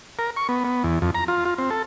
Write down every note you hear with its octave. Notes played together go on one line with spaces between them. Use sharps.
A#4
C#6
B3
B3
E2
F2
A#5
F4
F4
C4
A4